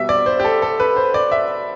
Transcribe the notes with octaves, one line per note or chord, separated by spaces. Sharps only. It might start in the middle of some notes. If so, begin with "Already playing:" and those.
Already playing: B2 G3 E5
D5
C5
G4
A4
A4
B4
C5
D5
E5